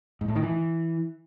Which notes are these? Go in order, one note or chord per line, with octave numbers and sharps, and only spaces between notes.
G#2
A2
D#3
E3